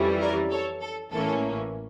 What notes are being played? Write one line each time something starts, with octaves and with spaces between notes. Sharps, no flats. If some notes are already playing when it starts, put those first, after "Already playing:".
Already playing: F2 E3 G3 C#4
A#4 D5
A4 C#5
A4
A1 A2 E3 A#3 C#4 A4